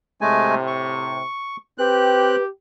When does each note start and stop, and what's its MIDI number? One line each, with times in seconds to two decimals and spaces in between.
0.21 1.19 45
0.21 1.19 48
0.21 0.55 56
0.21 0.55 57
0.21 0.55 80
0.67 1.57 85
1.78 2.36 60
1.78 2.46 67
1.78 2.42 71
1.78 2.36 90